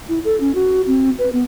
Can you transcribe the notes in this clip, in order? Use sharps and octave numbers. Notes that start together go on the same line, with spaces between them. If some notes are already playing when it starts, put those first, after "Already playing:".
E4
A4
C#4
F#4
C4
B4
B3